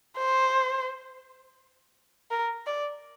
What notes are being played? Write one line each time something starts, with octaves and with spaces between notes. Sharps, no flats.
C5
A#4
D5